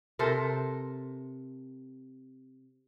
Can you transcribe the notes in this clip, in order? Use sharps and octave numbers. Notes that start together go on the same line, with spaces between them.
C3 A4 A#4 C5